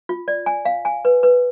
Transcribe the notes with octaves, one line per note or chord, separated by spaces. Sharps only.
F4
D5
G#5
F5
G#5
B4
B4